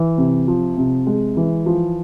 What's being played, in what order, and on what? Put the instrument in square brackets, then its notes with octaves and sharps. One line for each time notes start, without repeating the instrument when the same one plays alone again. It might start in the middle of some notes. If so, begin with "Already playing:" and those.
Already playing: [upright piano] E3
C3
F3
C3
G#3
E3
F3